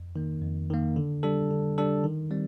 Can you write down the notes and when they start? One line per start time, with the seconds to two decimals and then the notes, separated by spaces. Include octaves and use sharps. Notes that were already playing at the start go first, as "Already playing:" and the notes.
Already playing: F2
0.16 D#3 A#3
0.42 F2
0.70 D#3 A#3
0.96 D3
1.23 G3 D4 A4
1.51 D3
1.78 G3 D4 A4
2.04 D#3
2.31 G3 C4